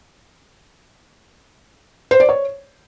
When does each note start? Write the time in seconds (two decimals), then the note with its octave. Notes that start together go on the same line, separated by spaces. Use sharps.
2.11 C5
2.20 D5
2.29 C#5